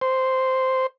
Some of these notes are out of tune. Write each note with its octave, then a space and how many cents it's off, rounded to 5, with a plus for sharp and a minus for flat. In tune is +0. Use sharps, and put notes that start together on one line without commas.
C5 -5